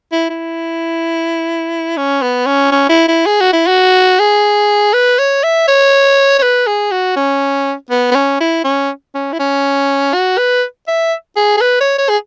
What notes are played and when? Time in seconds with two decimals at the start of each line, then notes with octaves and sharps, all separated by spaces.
0.12 E4
0.30 E4
1.97 C#4
2.22 B3
2.46 C#4
2.72 C#4
2.89 E4
3.08 E4
3.26 G#4
3.41 F#4
3.53 E4
3.67 F#4
4.19 G#4
4.93 B4
5.19 C#5
5.43 E5
5.68 C#5
6.39 C#5
6.43 B4
6.67 G#4
6.91 F#4
7.16 C#4
7.90 B3
8.11 B3
8.15 C#4
8.41 E4
8.64 C#4
9.14 C#4
9.33 E4
9.40 C#4
10.14 F#4
10.38 B4
10.88 E5
11.36 G#4
11.57 G#4
11.61 B4
11.80 C#5
11.98 C#5
12.09 G#4